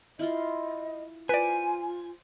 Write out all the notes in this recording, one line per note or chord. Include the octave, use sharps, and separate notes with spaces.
E4 F4 D#5 C6
F4 B4 C5 D5 G#5